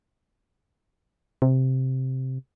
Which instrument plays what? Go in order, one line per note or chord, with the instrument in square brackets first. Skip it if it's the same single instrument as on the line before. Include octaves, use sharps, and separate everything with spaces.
[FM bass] C3